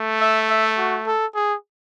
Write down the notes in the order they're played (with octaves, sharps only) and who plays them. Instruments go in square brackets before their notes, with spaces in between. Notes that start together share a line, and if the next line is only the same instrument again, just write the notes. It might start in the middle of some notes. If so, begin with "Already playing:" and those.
Already playing: [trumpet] A3
[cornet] E5
E5
F#4
A4
G#4